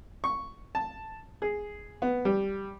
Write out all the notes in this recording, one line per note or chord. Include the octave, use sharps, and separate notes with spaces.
C#6
A5
G#4
B3
G3